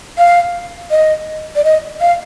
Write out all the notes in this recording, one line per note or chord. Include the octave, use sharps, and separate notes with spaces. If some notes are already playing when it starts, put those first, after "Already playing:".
F5
D#5
D5
D#5
F5